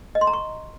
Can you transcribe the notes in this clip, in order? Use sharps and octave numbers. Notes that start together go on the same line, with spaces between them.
D#5
C6
A#5
C#6